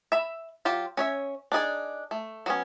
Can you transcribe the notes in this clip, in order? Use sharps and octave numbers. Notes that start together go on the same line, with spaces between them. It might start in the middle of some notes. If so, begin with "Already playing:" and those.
E5 B5
F#3 F4 G4
C#4 C#5 E5
D4 D#4 G#4 D5
A3
F#3 B3 C#4